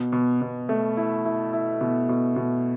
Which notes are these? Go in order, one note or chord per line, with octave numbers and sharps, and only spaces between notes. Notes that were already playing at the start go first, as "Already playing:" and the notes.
Already playing: B2
B2
B2
A3
E4
E4
E4
B2
B2
B2